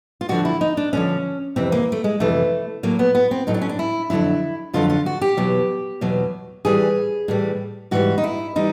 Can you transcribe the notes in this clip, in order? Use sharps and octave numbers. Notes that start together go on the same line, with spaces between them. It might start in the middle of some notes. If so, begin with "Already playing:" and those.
F4
D2 D3 F3 F#4
E4
D#4
D4
D2 D3 F3 C#4
F2 C3 E3 C4
A#3
A3
G#3
F2 C3 E3 A3
A2 F#3 A#3
B3
B3
C4
A2 F#3 D#4
D4
C#4
D4
E4
F2 D3 F#3 E4
F2 D3 F#3 F4
F4
F#4
G4
E2 B2 F#3
E2 B2 F#3
A2 E3 G3 G#4
A2 E3 G3
G#2 E3 G3 F#4
D#4
E4
E3 G3 D#4